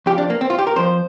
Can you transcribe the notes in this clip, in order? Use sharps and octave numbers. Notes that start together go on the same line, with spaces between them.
F2 F3 G4
D4
A#3
C4
F4
G4
A#4
F2 F3 C5